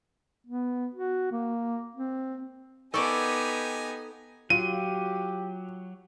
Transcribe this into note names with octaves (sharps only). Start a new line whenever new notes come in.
B3
F#4
A#3
C4
B3 D#4 G4 A4 A#4 D5 G#5 C#6
F#3 F4 G4 D#7